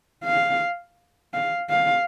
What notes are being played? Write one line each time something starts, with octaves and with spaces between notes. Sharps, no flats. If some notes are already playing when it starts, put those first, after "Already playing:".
F5
F5
F5